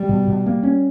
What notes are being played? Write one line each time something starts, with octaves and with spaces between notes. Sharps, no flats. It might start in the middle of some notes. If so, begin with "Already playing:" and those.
Already playing: G3
B2
B2
A#3
C#4